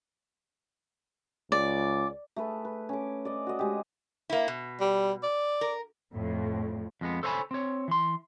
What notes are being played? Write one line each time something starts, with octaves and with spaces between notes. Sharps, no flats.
C#2 D5
A3 G#4 B4
B4
C#4 D6
D5 D#5
F#4 D#5
G#3 G4
A#3 E4
B2
G3
D5
A#4
F2 A2
F2 G#3 B3
A4 C5 C#5 D#5 G#5 B5
C4 C#5
E3 C6